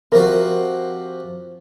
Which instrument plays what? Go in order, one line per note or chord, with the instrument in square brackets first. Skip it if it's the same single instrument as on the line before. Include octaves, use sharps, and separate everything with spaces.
[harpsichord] C3 F3 F#4 [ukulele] A#4